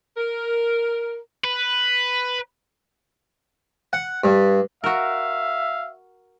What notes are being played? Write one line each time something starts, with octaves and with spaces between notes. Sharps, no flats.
A#4
B4
F#5
G2
F#4 A#4 E5 F5